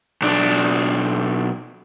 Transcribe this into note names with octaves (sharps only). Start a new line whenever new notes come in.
B1 D4